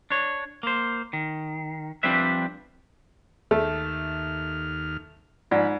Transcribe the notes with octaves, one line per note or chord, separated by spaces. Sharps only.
D4 C#5
A#3 C5
D#3
F3 G3 C4 D4 B4 E5
D#2 A3 F6
G#2 F3 F4 D5 F#5 B5